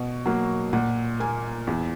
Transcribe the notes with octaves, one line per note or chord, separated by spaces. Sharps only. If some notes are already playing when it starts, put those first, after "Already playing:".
Already playing: B2
F#3 A#3
A#2 F#5
A#3 G#5
E2